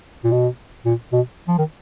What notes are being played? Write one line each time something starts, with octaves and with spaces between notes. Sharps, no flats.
A#2
B2
A#2
B2
F3
D#3